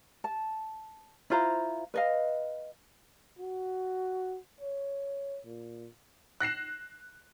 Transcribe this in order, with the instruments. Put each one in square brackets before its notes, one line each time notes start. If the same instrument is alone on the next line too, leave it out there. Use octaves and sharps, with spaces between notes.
[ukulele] A5
E4 F4 C5 A#5
B4 D#5 F5
[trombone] F#4
C#5
A#2
[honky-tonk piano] F#6 A#6 C7 E7